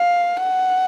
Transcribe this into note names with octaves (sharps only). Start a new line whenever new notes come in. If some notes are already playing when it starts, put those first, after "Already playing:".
Already playing: F5
F#5